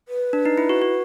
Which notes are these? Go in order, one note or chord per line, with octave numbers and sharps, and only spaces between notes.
B4
D4
D#4
E4
F#4
F#4